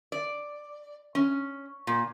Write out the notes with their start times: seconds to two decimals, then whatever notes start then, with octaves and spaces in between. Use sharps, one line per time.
0.12 D5
1.15 C#4
1.87 A#2